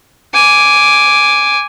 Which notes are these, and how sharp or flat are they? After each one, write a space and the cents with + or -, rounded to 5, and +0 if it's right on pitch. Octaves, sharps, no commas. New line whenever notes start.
G#5 +0 D6 -5